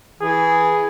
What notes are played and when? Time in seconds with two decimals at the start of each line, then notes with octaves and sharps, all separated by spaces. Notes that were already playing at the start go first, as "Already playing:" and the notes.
0.21 E3 G#4